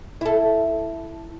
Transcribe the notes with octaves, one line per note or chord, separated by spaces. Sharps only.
E4 A4